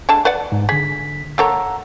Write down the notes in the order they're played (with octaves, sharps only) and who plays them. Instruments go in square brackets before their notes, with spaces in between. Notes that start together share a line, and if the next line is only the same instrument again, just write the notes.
[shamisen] D3 G#3 A5
B4 D5 F#5
[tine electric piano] G#2
[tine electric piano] D3 B6 [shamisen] G#4
[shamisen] A#3 A4 C#5 [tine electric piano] F#5 A#5 E6